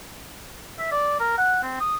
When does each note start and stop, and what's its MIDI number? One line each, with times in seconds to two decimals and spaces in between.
0.79 0.89 76
0.92 1.17 74
1.20 1.35 70
1.38 1.60 78
1.63 1.77 60
1.80 1.97 87